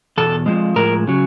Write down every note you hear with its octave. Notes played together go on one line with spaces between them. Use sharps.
E2 B2 A4
F2 C#3 F3 G#3
A2 F3 G#3 A#4
C#3 F#3